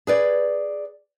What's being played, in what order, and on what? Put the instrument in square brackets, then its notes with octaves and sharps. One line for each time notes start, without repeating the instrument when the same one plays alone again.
[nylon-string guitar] G#4 B4 D5